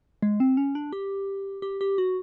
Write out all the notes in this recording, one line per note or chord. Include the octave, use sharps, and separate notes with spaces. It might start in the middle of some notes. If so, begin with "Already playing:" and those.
G#3
C4
C#4
D4
G4
G4
G4
F#4